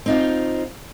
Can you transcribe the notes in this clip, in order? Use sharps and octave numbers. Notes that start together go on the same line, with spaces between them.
C4 D#4 F4